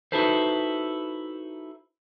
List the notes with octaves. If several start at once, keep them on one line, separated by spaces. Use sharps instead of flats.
D#4 E4 F#4 A4 B4 C5